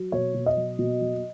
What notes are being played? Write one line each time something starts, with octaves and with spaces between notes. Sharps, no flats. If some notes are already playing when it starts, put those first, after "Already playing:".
Already playing: F#3
B2 C#5
B2
D#5
F#3
B2
F#3